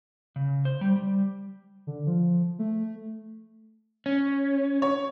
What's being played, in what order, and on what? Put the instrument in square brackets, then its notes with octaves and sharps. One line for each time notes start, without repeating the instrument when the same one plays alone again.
[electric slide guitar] C#3
C5
G3
G3
[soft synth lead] D3
F3
A3
[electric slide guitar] C#4
[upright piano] C#5